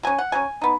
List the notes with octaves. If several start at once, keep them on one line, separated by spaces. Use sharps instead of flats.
F#3 C#4 G#5
F#5
F#3 C#4 G#5
B3 D#4